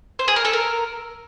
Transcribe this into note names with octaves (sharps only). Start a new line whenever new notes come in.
C5
G#4
A#4
A4
A#4